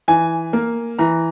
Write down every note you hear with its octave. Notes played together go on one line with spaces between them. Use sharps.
E3 G#5
A#3
E3 A#5